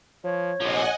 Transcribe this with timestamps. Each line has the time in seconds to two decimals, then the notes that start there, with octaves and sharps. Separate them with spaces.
0.24 F3 C#5
0.61 A#1 C3 F3 D#5 F#5 G#5